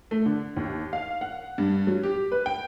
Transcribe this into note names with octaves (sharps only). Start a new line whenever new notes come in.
A3
D3
D#2
F5
F#5
G2
F#3
G4
B4
G5